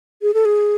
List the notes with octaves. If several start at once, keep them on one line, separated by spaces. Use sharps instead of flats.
G#4
A4
G#4